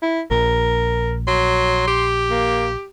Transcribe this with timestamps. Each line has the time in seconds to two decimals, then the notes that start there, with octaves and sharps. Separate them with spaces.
0.02 E4
0.31 A#1 A#4
1.27 F#3 C6
1.87 G4
2.30 A#3